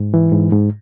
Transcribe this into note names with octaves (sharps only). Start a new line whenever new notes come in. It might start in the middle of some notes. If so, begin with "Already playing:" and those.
Already playing: G#2
E3
G#2
G#2